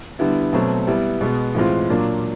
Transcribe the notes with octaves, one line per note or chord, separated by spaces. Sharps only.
D3 G3 B3 E4
B2 F#3 A3 C4
G3 B3 E4
B2 G#3 B3
A2 E3 G#3 C4 F4
A#2 F#3 A#3 D4 F4